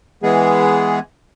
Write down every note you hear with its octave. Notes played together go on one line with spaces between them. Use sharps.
E3 G#3 B3 G#4